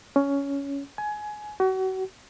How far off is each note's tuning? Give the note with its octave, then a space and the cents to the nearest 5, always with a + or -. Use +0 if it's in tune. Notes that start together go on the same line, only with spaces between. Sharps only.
C#4 +15
G#5 +20
F#4 +35